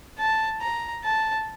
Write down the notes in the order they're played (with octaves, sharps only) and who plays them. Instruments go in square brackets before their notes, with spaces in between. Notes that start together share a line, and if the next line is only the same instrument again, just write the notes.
[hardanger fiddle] A5
A#5
A5